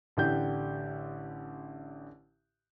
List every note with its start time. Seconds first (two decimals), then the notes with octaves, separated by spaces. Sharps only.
0.17 A1 D3 G4 G6